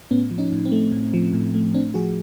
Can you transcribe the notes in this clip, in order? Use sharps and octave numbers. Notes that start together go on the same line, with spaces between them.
A2 B3 C#4
F3
C#4 D#4
A2
C4
A3
A2
F3
A2
A3
A2 C4 D4
F3 F#4 G#4